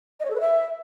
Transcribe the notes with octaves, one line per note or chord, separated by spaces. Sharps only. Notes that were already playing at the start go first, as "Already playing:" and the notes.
D#5
C#5
A4
B4
E5